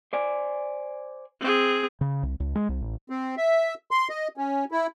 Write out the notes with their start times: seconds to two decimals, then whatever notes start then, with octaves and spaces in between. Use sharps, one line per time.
0.13 C5 D5 G#5
1.41 C4 G#4
2.01 C#3
2.23 C2
2.40 C#2
2.55 G#3
2.69 C2
2.81 A1
3.10 C4
3.37 E5
3.91 C6
4.09 D#5
4.37 C#4
4.72 E4